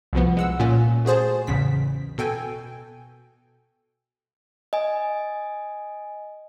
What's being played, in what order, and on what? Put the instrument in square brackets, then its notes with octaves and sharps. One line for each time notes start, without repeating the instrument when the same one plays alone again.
[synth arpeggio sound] C2 F2 B2 F3 B3
G#3 F#5 E6
A#2 A#3 C#4
A3 F#4 G#4 C5 A5
A1 E2 C#3 B6
B2 A4 G5 G#5
[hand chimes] D#5 G#5